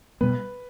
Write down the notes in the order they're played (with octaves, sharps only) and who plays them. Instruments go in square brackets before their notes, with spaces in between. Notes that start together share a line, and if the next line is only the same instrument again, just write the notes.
[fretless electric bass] B2 G3 B3 [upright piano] B4